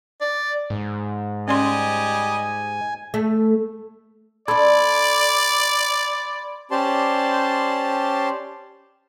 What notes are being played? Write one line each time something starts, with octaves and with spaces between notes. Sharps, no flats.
D5
G#2
G3 C#4 D5 D#5 G#5 C6
A3
D4 A4 D5 B5 C6 G#6
C#4 G4 C5 D5 A5 C6